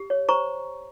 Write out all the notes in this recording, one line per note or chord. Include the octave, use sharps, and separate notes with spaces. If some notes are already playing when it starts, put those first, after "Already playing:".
Already playing: G4
C#5
C5 A#5 C#6